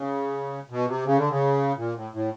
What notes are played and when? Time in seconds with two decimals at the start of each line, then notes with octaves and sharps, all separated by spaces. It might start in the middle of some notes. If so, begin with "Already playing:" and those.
Already playing: C#3
0.70 B2
0.88 C3
1.06 C#3
1.18 D3
1.29 C#3
1.77 A#2
1.95 A2
2.14 A2